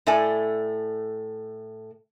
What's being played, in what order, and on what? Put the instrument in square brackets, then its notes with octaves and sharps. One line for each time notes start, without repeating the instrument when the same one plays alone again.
[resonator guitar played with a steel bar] A2 A3 A4 D5 G#5